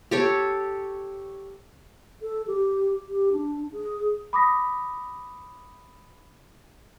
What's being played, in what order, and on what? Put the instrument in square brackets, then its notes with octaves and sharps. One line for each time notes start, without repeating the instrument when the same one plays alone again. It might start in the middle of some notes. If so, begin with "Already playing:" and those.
[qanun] G4 A4 C#5
[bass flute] A4
G4
G4
D4
G#4
[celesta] B5 D6 D#6 A#6 B6